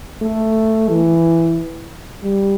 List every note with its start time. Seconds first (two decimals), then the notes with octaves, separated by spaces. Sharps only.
0.22 A3
0.89 E3
2.24 G3